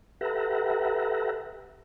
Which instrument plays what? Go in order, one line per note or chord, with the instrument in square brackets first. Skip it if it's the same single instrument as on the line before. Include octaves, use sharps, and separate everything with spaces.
[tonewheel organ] G4 A4 B4 E5 F#5 A#5